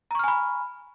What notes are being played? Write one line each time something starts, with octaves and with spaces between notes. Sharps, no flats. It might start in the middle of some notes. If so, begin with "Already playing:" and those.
G#5 A#5 B5 C#6 F6